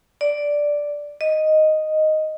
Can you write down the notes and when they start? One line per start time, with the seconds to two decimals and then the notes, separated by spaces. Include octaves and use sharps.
0.21 D5
1.21 D#5